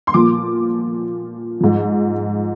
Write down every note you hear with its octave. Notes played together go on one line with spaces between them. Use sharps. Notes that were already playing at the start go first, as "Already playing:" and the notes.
C6
A#2 F3 D6
G#2 F3